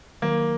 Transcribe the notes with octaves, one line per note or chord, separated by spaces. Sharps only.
D#3 F#3 A#3